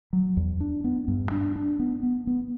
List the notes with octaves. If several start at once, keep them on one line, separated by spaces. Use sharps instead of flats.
F#3
E2
D4
B3
G2
D4
D4
B3
B3
B3